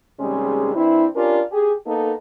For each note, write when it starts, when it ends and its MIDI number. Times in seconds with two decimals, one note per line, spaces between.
0.20 0.71 39
0.20 0.71 48
0.20 0.71 55
0.20 0.71 56
0.20 0.71 61
0.20 0.71 68
0.76 1.06 52
0.76 1.06 60
0.76 1.06 62
0.76 1.06 64
1.16 1.42 61
1.16 1.42 62
1.16 1.42 65
1.16 1.42 67
1.16 1.42 70
1.16 1.42 74
1.52 1.73 67
1.52 1.73 68
1.87 2.14 58
1.87 2.14 59
1.87 2.14 63
1.87 2.14 69